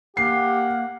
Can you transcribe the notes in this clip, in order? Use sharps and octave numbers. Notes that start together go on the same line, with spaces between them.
A#3 G4 F#5 C7